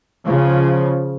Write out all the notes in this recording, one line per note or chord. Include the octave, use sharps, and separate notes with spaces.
C#3 F3